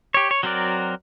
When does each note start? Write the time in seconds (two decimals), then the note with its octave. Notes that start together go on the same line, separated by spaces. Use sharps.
0.14 G4 C#5
0.31 C#5
0.43 F#3 C4 F#4 A#4 D5